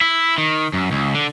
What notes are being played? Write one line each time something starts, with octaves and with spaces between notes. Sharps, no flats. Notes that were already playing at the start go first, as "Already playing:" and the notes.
E4
D#3
F#2
C#2
D3